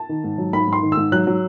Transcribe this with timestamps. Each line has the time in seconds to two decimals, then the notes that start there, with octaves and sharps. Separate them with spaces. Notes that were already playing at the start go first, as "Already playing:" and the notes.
Already playing: A5
0.09 D#3
0.24 G#2
0.38 F#3
0.53 G#2 B5
0.68 G#2
0.73 C6
0.83 D#3
0.92 E6
0.97 G#2
1.12 F#3 F#6
1.27 F#3